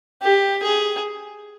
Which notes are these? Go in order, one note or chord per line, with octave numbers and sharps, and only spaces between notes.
G4
G#4